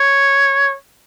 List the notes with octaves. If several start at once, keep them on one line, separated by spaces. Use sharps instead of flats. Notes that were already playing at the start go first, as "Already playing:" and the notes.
Already playing: C#5